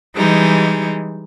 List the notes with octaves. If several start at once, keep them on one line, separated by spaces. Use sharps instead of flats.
E3 G3 G#3 D#4